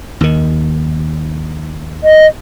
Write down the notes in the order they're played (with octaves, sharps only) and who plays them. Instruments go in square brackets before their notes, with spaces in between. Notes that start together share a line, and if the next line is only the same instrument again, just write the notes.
[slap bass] D#2 D#3
[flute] D#5